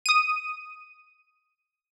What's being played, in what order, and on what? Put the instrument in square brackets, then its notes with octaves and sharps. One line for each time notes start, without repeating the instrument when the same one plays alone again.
[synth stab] D#6 D#7